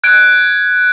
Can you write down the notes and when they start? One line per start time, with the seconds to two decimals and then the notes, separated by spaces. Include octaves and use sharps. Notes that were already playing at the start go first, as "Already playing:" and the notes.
0.04 F#6 G#6 D7